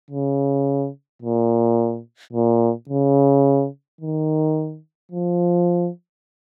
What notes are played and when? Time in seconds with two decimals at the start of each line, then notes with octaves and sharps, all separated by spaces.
0.11 C#3
1.22 A#2
2.33 A#2
2.89 C#3
4.01 D#3
5.12 F3